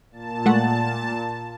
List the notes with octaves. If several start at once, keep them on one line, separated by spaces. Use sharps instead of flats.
A#2 A5
G#3 A3 F#5